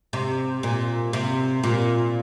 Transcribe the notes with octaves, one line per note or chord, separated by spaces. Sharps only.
C3
A#2
C3
A#2